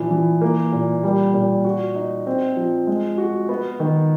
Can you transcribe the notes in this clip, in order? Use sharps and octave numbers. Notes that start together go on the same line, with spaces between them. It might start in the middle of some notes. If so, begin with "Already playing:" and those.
Already playing: A#2 E3 F3
E3
A#3
A#2
G3
A#2
F#4
D#4
C4
F3
G#3
F#4
B3
D#3